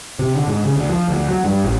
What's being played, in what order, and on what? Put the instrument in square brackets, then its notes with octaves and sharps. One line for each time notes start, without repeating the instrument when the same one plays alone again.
[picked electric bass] C3
D3
G#2
C#3
D2
F3
D2
F#3
G2
A1